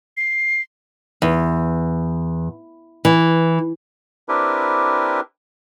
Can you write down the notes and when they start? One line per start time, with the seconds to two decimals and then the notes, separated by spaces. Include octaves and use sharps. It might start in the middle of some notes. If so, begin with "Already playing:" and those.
0.17 C7
1.22 E2
3.05 E3
4.29 C4 D4 E4 G4 A#4 B4